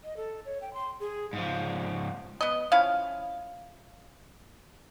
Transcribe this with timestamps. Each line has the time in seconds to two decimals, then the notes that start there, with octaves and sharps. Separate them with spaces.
0.04 D#5
0.17 A4
0.45 C#5
0.62 G5
0.74 C6
1.00 G#4
1.33 G#2 F3
2.41 B3 D#5
2.72 F3 C#4 E4 F5